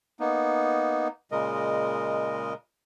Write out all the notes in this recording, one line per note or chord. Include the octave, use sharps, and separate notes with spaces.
A#3 B3 D#4
A#2 C#3 G#3 A#4 D#5